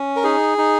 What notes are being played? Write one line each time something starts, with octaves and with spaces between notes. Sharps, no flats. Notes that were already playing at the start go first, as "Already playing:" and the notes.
Already playing: C#4
A#4
D#4 G#4
D#4